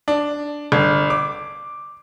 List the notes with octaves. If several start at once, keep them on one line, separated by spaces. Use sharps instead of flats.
D4
G1
D6